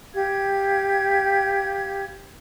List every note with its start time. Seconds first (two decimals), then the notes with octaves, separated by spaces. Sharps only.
0.13 G4 F5 G#6